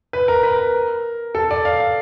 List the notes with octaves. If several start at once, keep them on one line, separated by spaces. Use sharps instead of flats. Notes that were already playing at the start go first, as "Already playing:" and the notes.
B4
A#4
B4
A#4
A4
D5
F5
F5